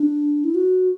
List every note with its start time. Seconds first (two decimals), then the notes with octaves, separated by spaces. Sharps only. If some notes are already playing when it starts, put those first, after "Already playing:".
Already playing: D4
0.44 E4
0.55 F#4